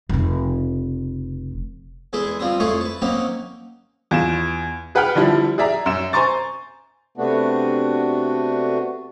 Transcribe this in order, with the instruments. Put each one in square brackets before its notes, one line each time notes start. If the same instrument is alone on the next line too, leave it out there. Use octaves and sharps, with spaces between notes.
[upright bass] F1 C#3
[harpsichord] E2 G#3 E4 G#4 E5
F3 G3 C4 D#6
F2 A3 E4 G#4 C#5 C6
B4 A5
D#3 F#3 A#3 C4 C#4 D#4
[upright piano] E2 F4 E7
G#4 B4 F#5 G5 B5 F6
D3 F3 G3 E4
G#4 D5 E5 A#5
F#2 E7
C5 G#5 A#5 C6 C#6 A6
[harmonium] C3 A3 B3 D4 F#4